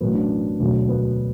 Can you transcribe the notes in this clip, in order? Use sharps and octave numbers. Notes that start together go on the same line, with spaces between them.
A1 A2 F#3 B3
D4
E1 D2 D3 F#3
B3